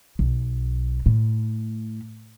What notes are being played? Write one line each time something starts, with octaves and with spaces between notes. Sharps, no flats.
B1
A2